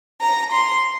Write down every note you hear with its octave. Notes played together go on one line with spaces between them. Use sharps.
A#5
C6